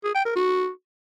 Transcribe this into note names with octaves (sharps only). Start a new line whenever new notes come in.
G#4
G5
A#4
F#4